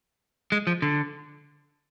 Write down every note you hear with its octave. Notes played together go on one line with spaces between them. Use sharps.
G#3
F3
D3